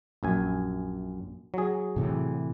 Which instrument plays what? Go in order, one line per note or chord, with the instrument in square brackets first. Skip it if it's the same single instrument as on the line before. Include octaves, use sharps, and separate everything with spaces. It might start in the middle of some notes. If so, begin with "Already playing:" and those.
[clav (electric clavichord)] A#1 F#2 G#5
F#3 G#4
[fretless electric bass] A2 C3 E3